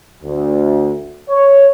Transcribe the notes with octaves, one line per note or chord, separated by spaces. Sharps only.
D2
C#5